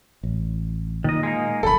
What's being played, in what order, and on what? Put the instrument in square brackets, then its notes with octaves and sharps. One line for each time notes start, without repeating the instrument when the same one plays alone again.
[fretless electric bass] A1
[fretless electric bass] A#2 [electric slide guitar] D#3 D#5
[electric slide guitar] G#3 A#3 D#4
[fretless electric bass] F#1 F2 [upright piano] A4 B5